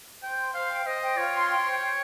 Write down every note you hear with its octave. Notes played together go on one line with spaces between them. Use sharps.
C5 G5
C6
C5 F5
G5
C5 D#5
G5
F4 C#5
C6
G5
C5
G5